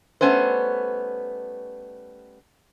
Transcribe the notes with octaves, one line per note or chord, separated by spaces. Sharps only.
G3 A3 B3 C#4 B4 C5